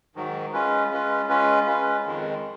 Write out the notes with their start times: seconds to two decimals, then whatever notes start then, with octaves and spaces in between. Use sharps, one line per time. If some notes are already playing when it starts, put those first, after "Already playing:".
0.15 G#2 D#3 F#3
0.53 G#3 C#4 F4 B4
0.91 G#3 C#4 F4 B4
1.29 G#3 C#4 F4 B4
1.67 G#3 C#4 F4 B4
2.04 F2 D#3 G#3